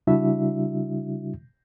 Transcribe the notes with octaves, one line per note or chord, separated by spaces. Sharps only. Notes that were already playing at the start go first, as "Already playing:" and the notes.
C#3 G3 D4 E4 F#4 E5